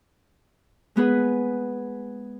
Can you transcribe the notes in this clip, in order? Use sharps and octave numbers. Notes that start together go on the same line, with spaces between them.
G#3 B3 G#4 B4